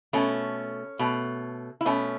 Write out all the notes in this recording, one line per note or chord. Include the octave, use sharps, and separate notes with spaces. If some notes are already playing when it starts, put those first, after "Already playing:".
B2 A3 C#4
B2 A3
E4
B2 A3 C#4